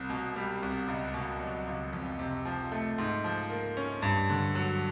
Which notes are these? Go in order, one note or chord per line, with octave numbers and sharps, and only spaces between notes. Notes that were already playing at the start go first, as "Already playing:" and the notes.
Already playing: C2
B2
G3
C2
C#2
B2
F#3
C#2
F2
C3
F3
A3
G#2
F3
A#3
C#4
G2
D3
F#3